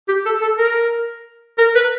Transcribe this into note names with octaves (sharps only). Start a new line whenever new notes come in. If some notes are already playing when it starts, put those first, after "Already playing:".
G4
A4
A4
A#4
A#4
B4